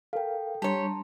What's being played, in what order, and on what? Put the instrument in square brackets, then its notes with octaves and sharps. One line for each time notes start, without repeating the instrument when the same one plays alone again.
[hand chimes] A4 G5 [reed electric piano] A#4 F5
[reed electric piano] G3 D4 [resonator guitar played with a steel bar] G4 C#5 [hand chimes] A5 A#5 C6